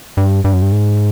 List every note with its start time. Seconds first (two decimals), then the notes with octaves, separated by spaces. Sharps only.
0.17 G2
0.44 G2
0.53 F#2
0.62 G2
0.72 G#2